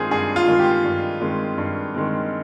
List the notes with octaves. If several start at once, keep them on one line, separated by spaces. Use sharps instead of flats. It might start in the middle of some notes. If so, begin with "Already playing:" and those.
Already playing: G2 D#3 G#3 C4 F4 G#4 C5
G2 G#4
F4
D#3 G#3 C4
G4
G2
D#3 G#3 C4
G2
D#3 G#3 C4